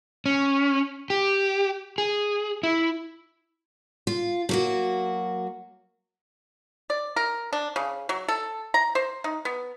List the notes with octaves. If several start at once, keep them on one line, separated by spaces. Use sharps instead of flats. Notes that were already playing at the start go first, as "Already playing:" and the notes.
C#4
G4
G#4
E4
F4
F#3 A#3 F#4
D5
A#4
D4
C#3
F#3
A4
A#5
C5
D#4
B3